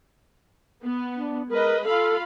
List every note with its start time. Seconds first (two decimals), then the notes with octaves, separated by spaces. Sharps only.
0.83 B3
1.17 D4
1.49 G#3 A#4 B4 D#5
1.84 F4 A4 F5 B5